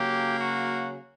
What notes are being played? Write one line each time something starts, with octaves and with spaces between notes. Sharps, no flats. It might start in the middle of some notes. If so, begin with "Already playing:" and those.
Already playing: C#3 F#3 A#3 G4
F#4